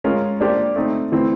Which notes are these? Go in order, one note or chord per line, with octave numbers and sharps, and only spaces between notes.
G#3 C#4 F4 A#4
A#3 D4 G4 C5
A3 C4 D#4
E3 A3 C4 E4